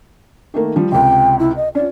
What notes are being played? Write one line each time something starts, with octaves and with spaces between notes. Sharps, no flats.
D#3 A3 A#3
F3 G3
C#2 C3 G5
E4
D#5
C#4 F4 D5